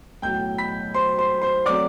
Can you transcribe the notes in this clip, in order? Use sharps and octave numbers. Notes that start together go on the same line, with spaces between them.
B1 A2 F#3 G5 G6
B5 B6
C5 C6
C5 C6
C5 C6
F#3 A3 C4 D5 D6